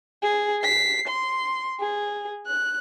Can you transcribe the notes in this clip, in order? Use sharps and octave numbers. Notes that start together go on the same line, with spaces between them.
G#4
B6 C7
C6
G#4
F#6